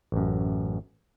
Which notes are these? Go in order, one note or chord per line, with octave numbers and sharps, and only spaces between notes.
A1 F#2